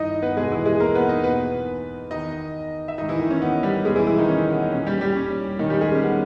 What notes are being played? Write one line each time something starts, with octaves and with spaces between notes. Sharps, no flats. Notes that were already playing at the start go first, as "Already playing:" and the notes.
Already playing: G2 D#3 D#4 E4 D#5
B3 B4
E2 B2 G#3 G#4
E3 E4
G#3 G#4
A#3 A#4
B3 B4
D#4 D#5
E2 B2 B3 B4
E2 D#3 D#4 D#5
E5
G#2 D#3 D#4 D#5
E3 E4
D#3 D#4
C#4
B3
G3 G4
E2 B2 G#3 G#4
E3 E4
E3 E4
D#3 D#4
C#4
B3
D#4
A#2 C#4
G3 G4
G3 G4
C#4
A#2 D#3 D#4
G3 G4
G#3 G#4
C#4
B3